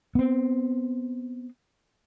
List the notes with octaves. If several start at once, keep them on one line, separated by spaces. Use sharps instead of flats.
B3 C4